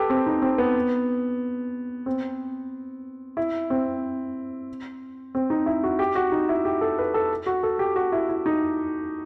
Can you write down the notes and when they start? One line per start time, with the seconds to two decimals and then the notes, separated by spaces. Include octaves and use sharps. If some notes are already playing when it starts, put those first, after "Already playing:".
Already playing: G4 A4 B4
0.10 C4
0.26 D#4
0.42 C4
0.58 B3
2.06 C4
3.37 E4
3.70 C4
5.35 C4
5.50 D#4
5.66 E4
5.83 F#4
5.99 G4
6.15 F#4
6.32 D#4
6.49 E4
6.65 G4
6.81 A4
6.98 B4
7.14 A4
7.46 F#4
7.63 A4
7.79 G4
7.96 F#4
8.12 E4
8.29 E4
8.46 D#4